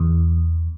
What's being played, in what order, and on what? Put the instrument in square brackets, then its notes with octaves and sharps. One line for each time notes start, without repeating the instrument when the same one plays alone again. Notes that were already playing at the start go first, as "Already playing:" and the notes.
Already playing: [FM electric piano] E2